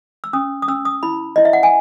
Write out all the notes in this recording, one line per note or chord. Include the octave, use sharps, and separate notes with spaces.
E6
C#4 D#6
D#6
C#4 E6
D#6
E4 B5
E4 D#5
E5
F#5
G#5